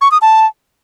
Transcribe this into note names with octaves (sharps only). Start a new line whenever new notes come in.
C#6
D#6
A5